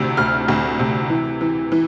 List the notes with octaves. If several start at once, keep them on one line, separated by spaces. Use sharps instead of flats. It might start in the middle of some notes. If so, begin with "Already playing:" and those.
Already playing: D2 C3 E6
D2 F6
D2
C3
E3
E3
E3